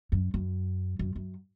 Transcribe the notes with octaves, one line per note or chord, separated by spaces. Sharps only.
F#2
F#2
F#2
F#2